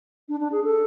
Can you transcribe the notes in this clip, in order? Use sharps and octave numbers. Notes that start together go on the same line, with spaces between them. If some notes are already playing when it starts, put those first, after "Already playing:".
D4
D4
G#4
A4